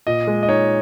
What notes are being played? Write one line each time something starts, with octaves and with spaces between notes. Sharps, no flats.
A#2 D#5
G#3
D#5
D#4 C#5